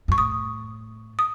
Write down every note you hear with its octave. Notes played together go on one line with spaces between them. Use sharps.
F#2 C#6
A2 D#6
D#6